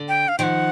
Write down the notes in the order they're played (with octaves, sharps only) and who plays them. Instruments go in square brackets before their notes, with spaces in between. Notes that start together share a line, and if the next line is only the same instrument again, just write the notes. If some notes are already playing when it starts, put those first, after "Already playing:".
Already playing: [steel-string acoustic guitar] D3
[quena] G5
F5
[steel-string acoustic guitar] D#3 F3 [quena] F#5 G5